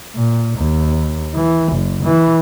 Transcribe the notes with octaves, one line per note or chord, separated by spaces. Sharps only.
A#2
D#2
E3
F#1
E3